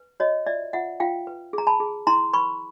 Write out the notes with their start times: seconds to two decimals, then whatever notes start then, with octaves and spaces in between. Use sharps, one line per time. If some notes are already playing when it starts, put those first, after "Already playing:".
Already playing: B4
0.20 F#4 C#5 D#5
0.46 F4 D5 E5
0.73 F4 E5 F#5
1.00 F4 F5 G5
1.27 B4
1.53 G#4 A#5
1.67 A5 B5
1.80 G#4
2.07 E4 A#5 C6
2.33 B4 B5 C#6